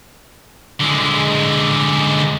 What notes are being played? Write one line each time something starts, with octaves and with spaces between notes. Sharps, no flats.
D3 G#3